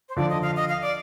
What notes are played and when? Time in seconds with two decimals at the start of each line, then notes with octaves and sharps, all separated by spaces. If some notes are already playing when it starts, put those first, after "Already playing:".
0.09 C5
0.17 D3 F3 D5
0.29 D#5
0.42 F5
0.56 D#5
0.69 F5
0.81 D5